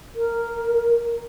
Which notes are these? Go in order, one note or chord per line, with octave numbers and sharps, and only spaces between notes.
A#4